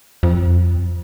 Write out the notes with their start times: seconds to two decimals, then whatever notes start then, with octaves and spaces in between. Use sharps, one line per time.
0.23 F2